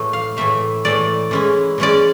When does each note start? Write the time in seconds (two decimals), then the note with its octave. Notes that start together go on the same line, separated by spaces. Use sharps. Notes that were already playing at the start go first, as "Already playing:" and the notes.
Already playing: A2 E3 A3
0.13 F5
0.37 A2 E3 A3 E5
0.85 A2 E3 A3 D5
1.31 E3 G#3 C#4 E4
1.78 E3 G#3 C#4 E4 D5